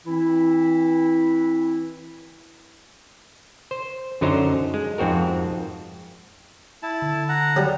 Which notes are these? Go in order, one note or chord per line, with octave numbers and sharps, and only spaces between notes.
E3 C4 E4
C5
F#2 D3 F#3 D#4 C5 A#5
G#3
F2 G#2 C4 F#4 A#4
E4 A5
D3
F#5 A#5
F#3 G3